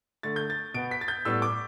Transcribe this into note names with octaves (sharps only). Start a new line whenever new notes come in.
D3 A3 A6
G6
A6
B2 B3 D7
B6
A6
G6
A2 G3 B3 E6
D6